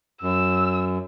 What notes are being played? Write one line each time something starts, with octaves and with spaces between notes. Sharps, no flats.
F#2 E6